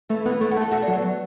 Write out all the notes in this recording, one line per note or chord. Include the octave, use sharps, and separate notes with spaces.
E3 A3
E3 B3
A3 E4
F#4
A3
A4
A3 F#4
D4
F#3
B3